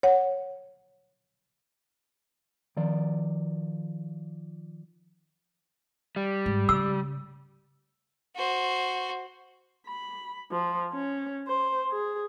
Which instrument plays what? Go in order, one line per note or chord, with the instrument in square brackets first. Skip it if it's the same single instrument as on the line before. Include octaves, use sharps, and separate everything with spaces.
[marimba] C#5 F#5
[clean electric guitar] D#3 F3 D5
[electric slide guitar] G3
[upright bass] G#2
[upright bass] C#3 [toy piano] E6
[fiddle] F#4 C5
[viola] B5
F3
C#4
C5
G#4